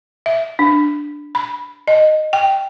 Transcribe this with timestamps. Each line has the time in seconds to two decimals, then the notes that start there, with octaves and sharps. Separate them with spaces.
0.26 E5
0.59 D4
1.35 B5
1.88 D#5
2.33 G5